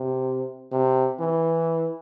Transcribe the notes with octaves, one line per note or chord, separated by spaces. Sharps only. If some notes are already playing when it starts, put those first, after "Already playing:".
Already playing: C3
C3
E3